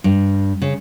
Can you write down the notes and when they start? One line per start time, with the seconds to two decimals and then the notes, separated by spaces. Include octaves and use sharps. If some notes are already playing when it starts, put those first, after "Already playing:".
0.04 G2
0.62 C#3